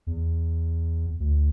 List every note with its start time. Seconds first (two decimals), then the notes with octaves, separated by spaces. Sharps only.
0.07 E2
1.20 D2